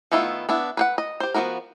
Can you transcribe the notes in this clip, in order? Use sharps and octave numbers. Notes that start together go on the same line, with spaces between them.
D#3 A3 B3 E4 F4
B3 D4 E4
B4 C5 F#5
D#5
G4 C5
F3 F#3 B3 F#4 A#4